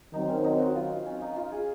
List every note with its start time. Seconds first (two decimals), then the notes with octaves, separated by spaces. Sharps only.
0.13 D#3 F#3 C4 D#4
0.29 C#4
0.44 D#4
0.59 F#4
0.76 F4
1.06 C#4
1.22 D#4
1.36 F4
1.52 G#4